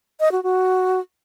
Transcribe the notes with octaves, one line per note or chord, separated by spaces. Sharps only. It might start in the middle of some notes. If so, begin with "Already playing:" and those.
D#5
F#4
F#4